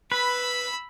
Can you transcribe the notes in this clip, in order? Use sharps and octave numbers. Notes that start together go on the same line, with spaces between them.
B4 B5 E6